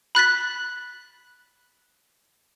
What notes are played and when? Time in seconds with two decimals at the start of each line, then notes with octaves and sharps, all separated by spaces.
0.15 B5 F#6 A6 B6